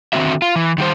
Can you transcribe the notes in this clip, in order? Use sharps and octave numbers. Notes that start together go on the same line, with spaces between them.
D3 D#3 C4 D#4 F#4 E5
F4
E3
D#3 G3 C5